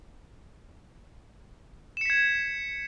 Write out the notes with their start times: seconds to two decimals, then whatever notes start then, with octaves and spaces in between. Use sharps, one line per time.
1.97 E7
2.01 C#7
2.05 B6
2.10 G#6